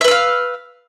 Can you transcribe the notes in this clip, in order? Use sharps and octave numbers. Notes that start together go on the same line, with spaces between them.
B4 E5 F5 E6